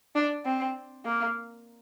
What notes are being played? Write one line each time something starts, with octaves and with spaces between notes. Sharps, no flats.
D4
C4
A#3